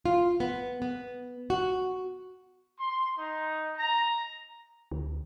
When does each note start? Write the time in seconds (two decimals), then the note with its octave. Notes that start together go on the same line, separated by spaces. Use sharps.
0.06 F4
0.40 B3
0.82 B3
1.50 F#4
2.79 C6
3.17 D#4
3.76 A#5
4.91 D2